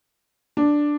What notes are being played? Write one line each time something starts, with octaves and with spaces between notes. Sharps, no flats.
D4